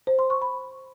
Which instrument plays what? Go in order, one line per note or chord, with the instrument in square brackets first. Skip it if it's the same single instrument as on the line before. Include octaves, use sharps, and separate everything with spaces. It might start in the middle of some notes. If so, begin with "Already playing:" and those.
[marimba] C5
C6
C#6
B5